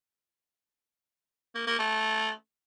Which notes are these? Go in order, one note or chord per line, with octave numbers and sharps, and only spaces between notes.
A#3
A#3
A3